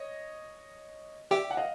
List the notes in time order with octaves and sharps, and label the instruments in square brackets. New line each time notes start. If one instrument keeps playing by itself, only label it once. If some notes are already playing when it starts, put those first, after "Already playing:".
Already playing: [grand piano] C#5 D#5
[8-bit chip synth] G4 [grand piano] D5 E5
[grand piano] F#5
D#5 F5